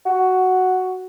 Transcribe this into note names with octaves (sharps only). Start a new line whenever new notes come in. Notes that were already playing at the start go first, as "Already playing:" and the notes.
F#4